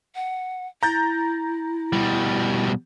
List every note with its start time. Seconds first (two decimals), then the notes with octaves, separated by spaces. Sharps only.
0.15 F#5
0.83 E4 A#5 G6 A6
1.93 B2 G3